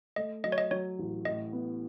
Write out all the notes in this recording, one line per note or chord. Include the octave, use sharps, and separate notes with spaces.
A3 D#5
F#3 D#5
C#5
D#5
F#3 C#5
A1
A2 D#5
B3